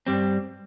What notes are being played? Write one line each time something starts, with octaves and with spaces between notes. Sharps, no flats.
G2 G3 C4